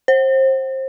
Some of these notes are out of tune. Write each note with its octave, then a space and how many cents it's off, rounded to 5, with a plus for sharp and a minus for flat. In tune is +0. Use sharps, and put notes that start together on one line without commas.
C5 +25